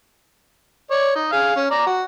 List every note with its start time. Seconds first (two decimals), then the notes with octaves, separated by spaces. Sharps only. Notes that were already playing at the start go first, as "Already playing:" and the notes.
0.91 C#5 D5
1.15 D#4
1.32 G#4 F5
1.56 C#4
1.71 D5 A#5
1.86 F#4